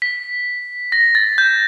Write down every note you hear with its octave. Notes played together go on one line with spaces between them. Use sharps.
B6
A#6
A6
G6